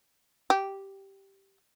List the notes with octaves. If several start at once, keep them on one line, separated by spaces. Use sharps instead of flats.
G4